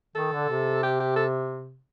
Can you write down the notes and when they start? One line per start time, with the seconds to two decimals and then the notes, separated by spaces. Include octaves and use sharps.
0.15 D#3 A4
0.32 D3
0.49 C3
0.83 G4
1.00 G4
1.16 A4